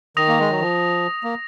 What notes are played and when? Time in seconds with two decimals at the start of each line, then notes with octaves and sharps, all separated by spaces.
0.17 D#3 D#6 A#6 F7
0.28 A#3
0.39 G#3
0.50 F#3
0.61 F3
1.24 A#3